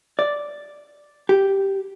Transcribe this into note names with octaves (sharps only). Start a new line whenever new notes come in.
D5
G4